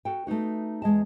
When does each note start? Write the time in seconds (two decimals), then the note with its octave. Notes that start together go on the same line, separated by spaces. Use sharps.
0.05 F#4 A4 G5
0.27 A3 B3 D#4 F#4
0.82 E2 G#3 D#5 A5